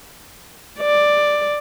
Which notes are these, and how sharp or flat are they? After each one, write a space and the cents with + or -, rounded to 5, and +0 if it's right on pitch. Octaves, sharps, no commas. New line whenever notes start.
D5 +5